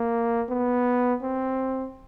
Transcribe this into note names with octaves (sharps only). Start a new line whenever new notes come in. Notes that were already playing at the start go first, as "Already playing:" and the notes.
Already playing: A#3
B3
C4